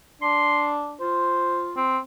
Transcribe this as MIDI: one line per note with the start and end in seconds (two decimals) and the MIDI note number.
0.22 0.95 62
0.22 0.73 84
1.01 1.84 65
1.01 1.68 72
1.76 1.98 60